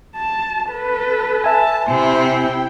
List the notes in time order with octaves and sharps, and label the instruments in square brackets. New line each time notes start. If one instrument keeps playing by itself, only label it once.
[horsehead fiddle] A5
A4 B4
[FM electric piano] E5 G#5 [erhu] A5
[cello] C3 C4 [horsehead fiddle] E4 [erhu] C5
[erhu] G5